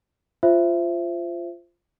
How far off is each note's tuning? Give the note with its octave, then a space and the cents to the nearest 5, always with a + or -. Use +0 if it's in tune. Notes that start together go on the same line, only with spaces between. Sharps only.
F4 -10 C5 +0 E5 +20